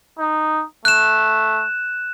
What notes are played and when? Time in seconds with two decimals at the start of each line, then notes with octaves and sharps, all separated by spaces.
0.19 D#4
0.85 A3 F#6 E7